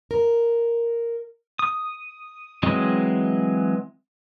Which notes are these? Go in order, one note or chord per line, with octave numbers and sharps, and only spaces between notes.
A#4
D#6
E3 F#3 G#3 C4 D#5